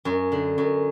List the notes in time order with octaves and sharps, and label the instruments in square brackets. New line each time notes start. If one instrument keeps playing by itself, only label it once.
[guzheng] F#2
D3
F#2